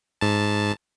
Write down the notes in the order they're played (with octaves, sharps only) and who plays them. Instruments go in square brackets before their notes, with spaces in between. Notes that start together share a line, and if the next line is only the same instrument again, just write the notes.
[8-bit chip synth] G#2 A5